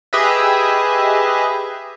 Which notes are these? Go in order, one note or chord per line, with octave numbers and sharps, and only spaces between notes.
G4 G#4 B4 D#5 E5